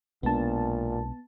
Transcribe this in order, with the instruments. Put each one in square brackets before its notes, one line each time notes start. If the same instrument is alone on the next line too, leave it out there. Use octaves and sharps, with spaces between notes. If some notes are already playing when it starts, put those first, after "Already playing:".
[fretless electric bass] B1 G#3 D4 [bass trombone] A#2 [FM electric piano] B3 A5